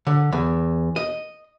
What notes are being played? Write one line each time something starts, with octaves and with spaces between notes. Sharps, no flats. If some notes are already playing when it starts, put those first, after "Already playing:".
D3
E2
D#5